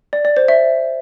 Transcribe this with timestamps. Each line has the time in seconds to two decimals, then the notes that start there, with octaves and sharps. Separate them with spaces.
0.13 D5
0.25 D5
0.37 C5
0.48 E5